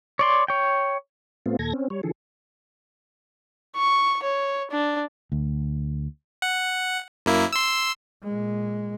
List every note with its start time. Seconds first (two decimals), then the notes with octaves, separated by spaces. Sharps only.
0.19 C#5 D5 C6
0.48 C#5 G5
1.46 A2 A3 B3 C4 F4
1.59 D#2 A#2 A4 G#6 A#6
1.73 C4 C#4
1.90 G3 C#5
2.03 D3 E3 F3 G#4 A4
3.76 C#6
4.23 C#5
4.71 D4
5.32 D2
6.42 F#5
7.26 F#2 A#3 E4
7.52 C6 E6
8.23 A#2 G#3